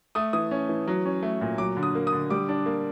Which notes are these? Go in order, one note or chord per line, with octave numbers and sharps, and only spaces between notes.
A3 D#6
E3 D#6
C#4
E3
F#3
C#4
A3
A#2
F#3 D6
D3
D#6
A#3
D#6
D3
G3 D6
D4
A#3